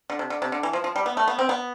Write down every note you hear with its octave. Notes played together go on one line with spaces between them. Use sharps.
D3
C3
D3
C3
D3
E3
F3
F3
G3
B3
A3
B3
C4
B3